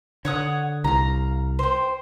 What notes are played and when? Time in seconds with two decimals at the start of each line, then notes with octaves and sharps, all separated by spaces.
0.25 D3 C#5 F#5 D#6
0.84 C2 F5 A#5
1.59 C5 G5